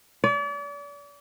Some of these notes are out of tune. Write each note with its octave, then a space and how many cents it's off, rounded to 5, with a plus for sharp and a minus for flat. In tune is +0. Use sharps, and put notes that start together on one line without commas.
D5 -40